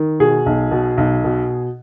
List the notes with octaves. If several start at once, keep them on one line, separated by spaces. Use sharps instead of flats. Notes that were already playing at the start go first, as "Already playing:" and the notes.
Already playing: D#3
B2 G#4
B1
B2
B1
B2